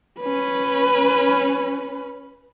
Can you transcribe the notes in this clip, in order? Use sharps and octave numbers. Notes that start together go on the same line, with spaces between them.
C#4 B4